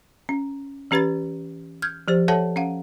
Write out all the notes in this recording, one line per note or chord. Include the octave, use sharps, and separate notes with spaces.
C#4
E3 C#4 G4 B4 B5 A6
F6 G6 G#6
F3 G4 C5
A4 C#5 E5 F#5 A5
C#4 F5 F#5